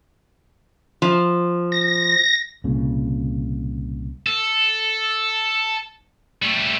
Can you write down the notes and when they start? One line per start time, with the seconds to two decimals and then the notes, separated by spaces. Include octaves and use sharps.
1.02 F3
1.72 A#6
2.64 C2 A#2 C#3
4.26 A4
6.42 G3 A3